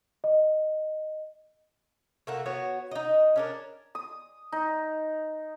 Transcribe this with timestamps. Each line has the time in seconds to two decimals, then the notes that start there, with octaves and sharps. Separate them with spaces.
0.24 D#5
2.27 A3 A#3 F#4
2.46 B3 F#4 C#5
2.91 D#4 D#5
3.36 C#4 D4 A#4
3.95 D#6
4.52 D#4